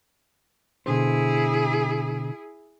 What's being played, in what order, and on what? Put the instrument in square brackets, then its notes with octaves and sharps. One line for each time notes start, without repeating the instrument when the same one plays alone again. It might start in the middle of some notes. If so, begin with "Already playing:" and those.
[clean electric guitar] B2 D3 C5 [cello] E4 G#4